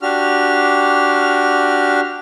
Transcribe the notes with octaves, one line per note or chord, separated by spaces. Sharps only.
D4 F#4 G4 F6